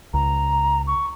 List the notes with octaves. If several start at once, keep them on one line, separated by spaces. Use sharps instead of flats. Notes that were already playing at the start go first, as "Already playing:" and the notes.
C#2 A#5
C#6